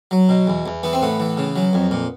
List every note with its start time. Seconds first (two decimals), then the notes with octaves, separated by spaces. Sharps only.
0.11 F#3
0.29 B2
0.47 E2
0.66 E2
0.83 E3 B3
0.93 C4
1.01 A2 B3
1.20 E3
1.37 C#3
1.56 F#3
1.73 F2
1.91 A#2